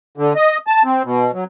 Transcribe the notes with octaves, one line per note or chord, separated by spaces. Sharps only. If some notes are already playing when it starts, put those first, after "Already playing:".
D3
D#5
A5
C4
B2
F#3